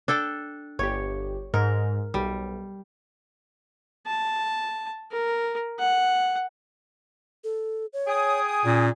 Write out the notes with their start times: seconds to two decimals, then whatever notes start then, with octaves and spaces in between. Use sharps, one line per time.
0.08 D4 A4 G5
0.79 G1 G4 C#5
1.54 G#2 A#4
2.14 B1 G3
4.06 A5
5.11 A#4
5.79 F#5
7.44 A4
7.93 C#5
8.07 G#4 G5 G#5 D#6
8.65 A#2 C#4